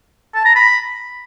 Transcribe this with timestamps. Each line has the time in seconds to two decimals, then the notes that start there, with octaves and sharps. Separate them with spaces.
0.35 A5
0.45 A#5
0.56 B5